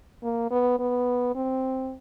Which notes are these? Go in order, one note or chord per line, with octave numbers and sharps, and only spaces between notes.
A#3
B3
B3
C4